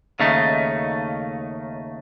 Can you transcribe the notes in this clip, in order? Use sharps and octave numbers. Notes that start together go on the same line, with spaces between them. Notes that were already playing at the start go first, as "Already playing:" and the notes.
D#2 C#3 A3 D#4